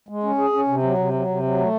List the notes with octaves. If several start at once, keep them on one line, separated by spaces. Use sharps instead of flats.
G#3
C#4
G#4
C#4
C3
F#3
C3
F#3
C3
F#3
A3